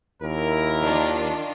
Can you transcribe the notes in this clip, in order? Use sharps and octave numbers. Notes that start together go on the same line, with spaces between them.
D#2 E4 A#4
D#3 D4 F4